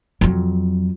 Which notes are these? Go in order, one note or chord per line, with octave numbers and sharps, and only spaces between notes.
F2 F#3